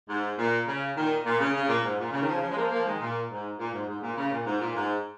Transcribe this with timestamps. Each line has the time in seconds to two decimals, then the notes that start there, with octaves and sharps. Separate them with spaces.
0.09 G#2
0.38 A#2
0.67 C#3
0.96 A#2 D#3
1.26 A#2
1.40 C#3
1.55 C#3
1.69 A#2
1.84 G#2
1.99 A#2
2.12 C#3
2.22 D#3
2.28 C#3 F3
2.42 C#3 F3
2.51 G#3
2.56 F3 A#3
2.71 F3 A#3
2.85 D#3 G#3
3.00 A#2
3.30 G#2
3.59 A#2
3.73 G#2
3.88 G#2
4.02 A#2
4.17 C#3
4.32 A#2
4.46 G#2
4.61 A#2
4.75 G#2